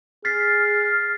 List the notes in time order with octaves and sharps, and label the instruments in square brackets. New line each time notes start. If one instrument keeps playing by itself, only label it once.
[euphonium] G#4 [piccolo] F6 [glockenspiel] A6 B6 C7